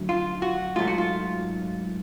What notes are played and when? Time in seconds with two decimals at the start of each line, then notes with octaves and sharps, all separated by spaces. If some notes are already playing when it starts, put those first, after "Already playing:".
Already playing: F#2 D3 F#3 A3
0.09 F4
0.42 F#4
0.76 G#2 F#3 A3 F4
0.88 F#4
0.98 F4